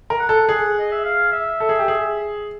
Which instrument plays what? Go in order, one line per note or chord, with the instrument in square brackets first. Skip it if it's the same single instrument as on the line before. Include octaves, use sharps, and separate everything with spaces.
[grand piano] A#4
[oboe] F#5
[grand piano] A4
[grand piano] G#4 [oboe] F#5
[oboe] D#5
E5
F5
E5
[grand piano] A4
G#4
G4
G#4